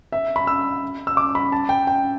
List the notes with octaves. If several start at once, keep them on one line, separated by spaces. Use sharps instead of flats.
E5
B5
E6
E6
D6
B5
A5
G5
G5